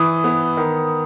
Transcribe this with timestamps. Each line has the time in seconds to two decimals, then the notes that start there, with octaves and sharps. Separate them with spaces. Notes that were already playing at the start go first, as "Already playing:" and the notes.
Already playing: E3 D#6
0.24 B3
0.57 D#3